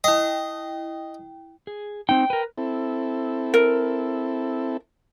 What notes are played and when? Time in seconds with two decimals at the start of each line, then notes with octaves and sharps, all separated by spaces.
0.04 E4 D#5 G5
1.67 G#4
2.09 C4 D#4 G5
2.30 A#4 B4
2.58 C4 E4 A4
3.54 A#4